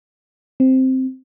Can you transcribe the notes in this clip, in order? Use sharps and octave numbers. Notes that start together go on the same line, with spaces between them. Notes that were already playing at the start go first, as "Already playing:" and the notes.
C4